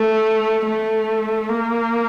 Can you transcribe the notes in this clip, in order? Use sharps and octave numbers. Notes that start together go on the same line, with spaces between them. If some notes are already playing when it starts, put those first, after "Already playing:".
Already playing: A3
A3
A#3